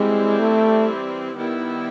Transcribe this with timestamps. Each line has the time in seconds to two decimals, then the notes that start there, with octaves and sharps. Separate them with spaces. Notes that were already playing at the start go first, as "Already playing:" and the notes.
Already playing: E3 G3 G#3 C4 E4 G4
0.39 A3
1.36 D#3 G3 B3 E4